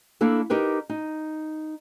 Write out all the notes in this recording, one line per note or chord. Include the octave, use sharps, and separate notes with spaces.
A#3 D4 E4 A4
D#4 G4 A#4 B4
D#4